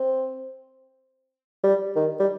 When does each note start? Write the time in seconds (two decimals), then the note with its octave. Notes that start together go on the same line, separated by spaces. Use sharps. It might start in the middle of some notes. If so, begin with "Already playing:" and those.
Already playing: C4
1.64 G3
1.96 D#3
2.20 G3